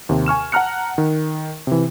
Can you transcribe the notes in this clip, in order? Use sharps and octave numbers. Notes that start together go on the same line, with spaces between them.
D#2 C3
G#5 C#6 F6 E7
F#5 A5 A#5 F6 F#6 C#7
D#3
C3 E3